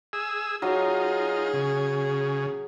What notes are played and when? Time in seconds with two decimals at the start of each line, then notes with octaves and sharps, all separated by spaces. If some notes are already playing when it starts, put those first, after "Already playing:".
0.13 G#4 E6
0.62 F#3 D#4 F4 G#4
1.54 C#3